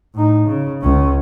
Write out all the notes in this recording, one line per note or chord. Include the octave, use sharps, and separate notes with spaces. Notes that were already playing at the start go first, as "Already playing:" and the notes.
A2 D#4
C#3
C#2 C#4